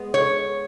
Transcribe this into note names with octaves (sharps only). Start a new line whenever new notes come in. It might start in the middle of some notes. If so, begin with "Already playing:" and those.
Already playing: G#3 B3
C#5